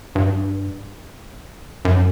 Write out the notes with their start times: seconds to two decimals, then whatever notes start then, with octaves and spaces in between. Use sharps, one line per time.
0.15 G2
1.85 F#2